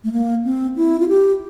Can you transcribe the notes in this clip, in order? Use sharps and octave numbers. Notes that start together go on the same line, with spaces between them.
A3
A#3
C4
E4
F4
G4